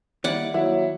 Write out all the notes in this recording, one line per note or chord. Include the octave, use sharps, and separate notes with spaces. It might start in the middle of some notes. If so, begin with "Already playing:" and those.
D#2 G3 E4 D5 F#5
D#2 F#3 E4